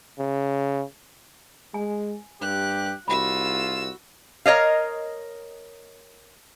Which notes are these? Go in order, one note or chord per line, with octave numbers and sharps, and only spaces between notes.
C#3
G#3 G#5
G2 G4 F#6
C2 F4 F#4 B5 E6
A#4 C#5 D#5 F5